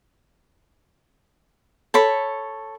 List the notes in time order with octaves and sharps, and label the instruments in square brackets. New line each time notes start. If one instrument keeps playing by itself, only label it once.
[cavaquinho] A4 C#5 B5